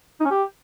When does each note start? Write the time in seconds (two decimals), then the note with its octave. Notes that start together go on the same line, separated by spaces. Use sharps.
0.20 D#4
0.25 C#4
0.31 G4